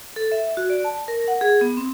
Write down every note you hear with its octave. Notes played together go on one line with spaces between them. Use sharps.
A4
E5
F#4
D5
A5
A#4
F#5
G#4
B3
C4